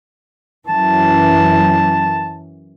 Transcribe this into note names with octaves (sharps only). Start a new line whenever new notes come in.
F#2 E3 A5